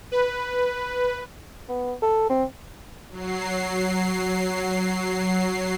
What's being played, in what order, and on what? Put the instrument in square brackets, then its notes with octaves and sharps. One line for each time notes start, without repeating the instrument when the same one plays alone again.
[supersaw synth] B4
[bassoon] B3
A4
C4
[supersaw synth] F#3 C7